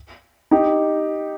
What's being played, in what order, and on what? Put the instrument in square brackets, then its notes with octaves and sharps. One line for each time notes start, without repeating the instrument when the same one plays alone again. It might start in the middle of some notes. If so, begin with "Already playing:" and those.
[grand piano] D#4 G4